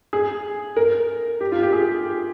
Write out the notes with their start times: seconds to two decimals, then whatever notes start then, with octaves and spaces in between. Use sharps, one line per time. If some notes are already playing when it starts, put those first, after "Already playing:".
0.13 G#4
0.76 A#4
1.40 G4
1.52 F4
1.62 G4
1.73 G#4